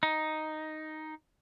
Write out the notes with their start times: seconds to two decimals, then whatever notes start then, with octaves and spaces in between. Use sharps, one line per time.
0.03 D#4